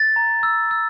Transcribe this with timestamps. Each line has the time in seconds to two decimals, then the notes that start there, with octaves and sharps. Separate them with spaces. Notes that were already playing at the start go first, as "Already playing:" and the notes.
Already playing: A6
0.16 A#5
0.43 E6
0.71 E6